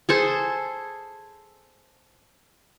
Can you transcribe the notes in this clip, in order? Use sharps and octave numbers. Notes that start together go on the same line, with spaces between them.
G#4 A4 C5